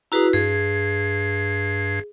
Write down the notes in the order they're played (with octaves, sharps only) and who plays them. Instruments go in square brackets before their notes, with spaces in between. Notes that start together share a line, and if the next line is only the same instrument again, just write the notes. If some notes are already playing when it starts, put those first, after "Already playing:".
[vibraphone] E4 F#4 B4 [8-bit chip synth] G#4 A#5
[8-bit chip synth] G2 G#6 C7 [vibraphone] G#4